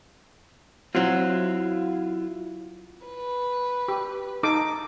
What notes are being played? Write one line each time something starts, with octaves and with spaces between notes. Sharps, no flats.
F#3 C4 E4 F4
B4
G4
D#4 A4 D6